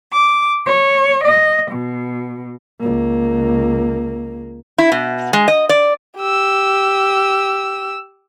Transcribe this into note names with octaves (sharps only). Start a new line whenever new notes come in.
D6
C#5
D#5
B2
C#2 A#3
E4
B2
G#3
D#5
D5
G4 E6